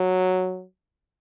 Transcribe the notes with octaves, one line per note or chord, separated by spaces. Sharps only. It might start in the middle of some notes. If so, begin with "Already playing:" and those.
Already playing: F#3